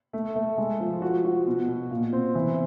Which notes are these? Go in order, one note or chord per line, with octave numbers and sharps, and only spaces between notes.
A3
A3
G#3
F3
F#4
F#4
B2
B2
A#2
C4
E3